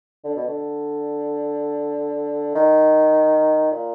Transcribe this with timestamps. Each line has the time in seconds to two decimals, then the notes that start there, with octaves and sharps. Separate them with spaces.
0.24 D3
0.36 B2
0.47 D3
2.55 D#3
3.71 A#2